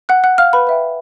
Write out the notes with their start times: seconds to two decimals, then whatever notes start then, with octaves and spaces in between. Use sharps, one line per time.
0.09 F#5 F#6
0.24 F#5 F#6
0.38 F5 F6
0.53 B4 B5
0.67 B4 E5 G5